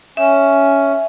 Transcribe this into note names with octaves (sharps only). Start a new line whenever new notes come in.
C#4 E5